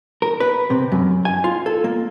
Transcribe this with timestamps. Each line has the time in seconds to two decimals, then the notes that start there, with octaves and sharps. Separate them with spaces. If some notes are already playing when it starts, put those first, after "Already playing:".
0.22 A#4
0.40 B4
0.70 C3
0.92 F#2
1.25 G#5
1.44 F4
1.66 A4
1.84 A#3